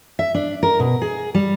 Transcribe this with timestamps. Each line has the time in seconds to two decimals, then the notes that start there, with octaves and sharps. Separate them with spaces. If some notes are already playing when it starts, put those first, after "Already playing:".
0.19 E5
0.35 D4
0.63 A#4
0.80 B2
1.02 G#4
1.34 G3